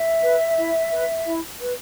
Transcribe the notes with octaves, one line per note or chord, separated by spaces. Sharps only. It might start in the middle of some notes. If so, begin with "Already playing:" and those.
Already playing: E5
B4
E4
B4
E4
B4